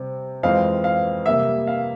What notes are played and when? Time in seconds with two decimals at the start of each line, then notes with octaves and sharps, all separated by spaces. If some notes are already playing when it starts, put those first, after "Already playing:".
Already playing: C3 G3 C4
0.43 F2 E3 G#3 C4 F5
0.84 F5
1.26 C3 G3 A#3 E5
1.67 F5